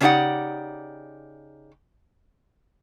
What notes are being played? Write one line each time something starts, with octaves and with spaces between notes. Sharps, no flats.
C#3 D4 D#4 G4 D5 F#5